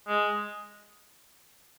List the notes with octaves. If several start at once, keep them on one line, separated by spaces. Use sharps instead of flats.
G#3